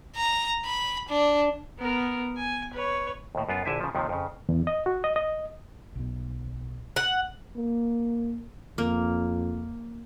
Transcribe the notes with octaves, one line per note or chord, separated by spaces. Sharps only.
A#5
B5
D4
B3 A#4
G#5
B4 C#5
D#2 A2
F#2 B3 F4
A#1 D3 E4 E5 G#5
C#3 F3
D#2 C3 D#3 F3
F2 C#3
E2
D#5
F#4
D#5
D#5
B1 B2
F#5
A#3
F2 A#3